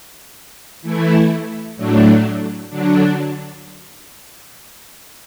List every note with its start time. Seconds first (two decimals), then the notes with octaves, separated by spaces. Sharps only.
0.82 E3 A3 E4
1.77 A2 F#3 A3 D4
2.70 D3 F#3 D4